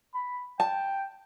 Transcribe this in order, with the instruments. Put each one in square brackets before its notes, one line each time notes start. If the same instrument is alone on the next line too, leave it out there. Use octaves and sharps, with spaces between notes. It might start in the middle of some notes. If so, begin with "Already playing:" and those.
[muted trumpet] B5
[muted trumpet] G5 [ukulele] A5